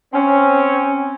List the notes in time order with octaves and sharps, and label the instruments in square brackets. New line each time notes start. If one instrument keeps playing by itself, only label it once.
[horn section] C4 C#4